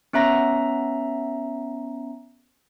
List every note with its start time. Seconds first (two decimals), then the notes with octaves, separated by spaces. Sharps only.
0.13 B3 C#4 E5 A#5 A#6